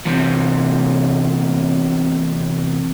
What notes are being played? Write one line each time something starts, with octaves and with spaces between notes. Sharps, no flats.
E2 C3